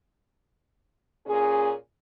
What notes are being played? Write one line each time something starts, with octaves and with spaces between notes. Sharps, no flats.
A#2 C#4 G#4